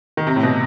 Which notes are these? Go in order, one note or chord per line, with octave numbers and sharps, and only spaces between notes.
D#3
C3
A2
B2